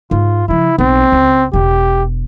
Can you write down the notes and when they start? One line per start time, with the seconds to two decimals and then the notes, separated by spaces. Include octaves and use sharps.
0.11 G#2 F4
0.48 C#3 F3 E4
0.79 B1 C4
1.12 C#2
1.53 E1 B2 G4